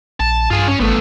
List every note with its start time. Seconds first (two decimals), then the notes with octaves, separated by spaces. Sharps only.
0.20 A#1 A5
0.50 G2 F4 G#4
0.67 C#4
0.80 G#1 A3 B3